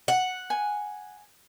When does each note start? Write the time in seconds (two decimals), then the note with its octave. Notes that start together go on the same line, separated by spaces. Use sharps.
0.08 F#5
0.50 G#5